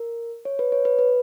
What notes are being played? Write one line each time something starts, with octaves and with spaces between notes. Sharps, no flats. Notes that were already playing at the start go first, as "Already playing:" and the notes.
Already playing: A#4
C#5
B4
C#5
B4
B4